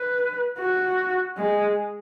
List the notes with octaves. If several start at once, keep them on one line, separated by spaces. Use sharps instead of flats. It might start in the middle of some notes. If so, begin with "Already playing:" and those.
Already playing: B4
F#4
G#3